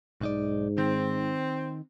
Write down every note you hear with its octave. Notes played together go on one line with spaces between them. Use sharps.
B1 G#2 D#4 D5
D#3 C4